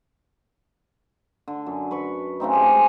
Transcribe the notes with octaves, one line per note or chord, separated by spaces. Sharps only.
D3
F#2
B4 B5 C#6
C#3 A3 C4 D#4
G4 G#4 D6
G#3